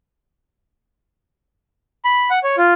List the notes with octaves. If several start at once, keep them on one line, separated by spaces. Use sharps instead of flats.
B5
F#5
C#5
F4